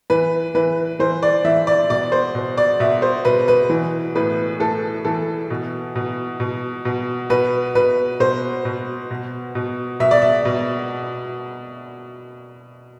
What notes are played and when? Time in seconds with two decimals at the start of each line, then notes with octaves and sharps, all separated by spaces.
0.10 E3 B4
0.55 E3 B4
0.99 E3 C5
1.23 D5
1.45 E3 E5
1.67 D5
1.90 B2 D5
2.12 C5
2.35 B2
2.57 D5
2.80 B2 E5
3.02 C5
3.25 B2 B4
3.48 B4
3.70 E3
4.15 A2 B4
4.60 A2 A4
5.05 E3 A4
5.50 B2
5.96 B2
6.40 B2
6.85 B2
7.30 B2 B4
7.75 B2 B4
8.20 B2 C5
8.65 B2
9.11 B2
9.55 B2
10.00 B2 E5
10.11 D5
10.22 E5
10.45 B2